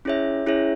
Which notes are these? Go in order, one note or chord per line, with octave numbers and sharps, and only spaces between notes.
C#4 E4 G#4 C#5 E5
C#4 E4 G#4 C#5 E5